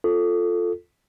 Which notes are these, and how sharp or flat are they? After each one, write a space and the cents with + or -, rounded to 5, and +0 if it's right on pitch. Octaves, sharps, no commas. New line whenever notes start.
F4 +5 A4 +0